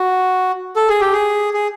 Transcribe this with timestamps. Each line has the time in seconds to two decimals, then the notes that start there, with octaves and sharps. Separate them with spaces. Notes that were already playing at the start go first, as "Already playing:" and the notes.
Already playing: F#4
0.76 A4
0.88 G#4
1.01 G4
1.12 G#4
1.53 G#4